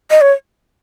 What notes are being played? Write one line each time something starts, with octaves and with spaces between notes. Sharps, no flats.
D#5
C#5